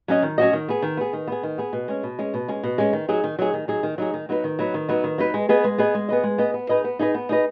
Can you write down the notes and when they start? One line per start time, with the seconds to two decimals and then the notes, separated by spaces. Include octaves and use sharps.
0.08 F#3 C#4 F#4 D#5
0.23 D#3
0.38 F#3 C#4 F#4 D#5
0.53 D#3
0.68 B3 G#4
0.82 D#3
0.97 B3 G#4
1.13 D#3
1.27 B3 G#4
1.43 D#3
1.58 B3 G#4
1.73 B2
1.88 G#3 C#4
2.03 B2
2.19 G#3 C#4
2.34 B2
2.48 G#3 C#4
2.64 B2
2.78 G#3 C#4
2.93 D#3
3.08 F#3 D#4 G#4
3.24 D#3
3.39 F#3 D#4 G#4
3.53 D#3
3.68 F#3 D#4 G#4
3.83 D#3
3.98 F#3 D#4 G#4
4.14 D#3
4.29 F#3 B3 D#4 B4
4.44 D#3
4.59 F#3 B3 D#4 B4
4.74 D#3
4.89 F#3 B3 D#4 B4
5.04 D#3
5.18 F#3 B3 D#4 B4
5.34 G#3
5.49 B3 G#4 B4 D#5
5.64 G#3
5.78 B3 G#4 B4 D#5
5.95 G#3
6.09 B3 G#4 B4 D#5
6.24 G#3
6.38 B3 G#4 B4 D#5
6.54 B3
6.69 D#4 G#4 B4 D#5
6.84 B3
6.99 D#4 G#4 B4 D#5
7.14 B3
7.29 D#4 G#4 B4 D#5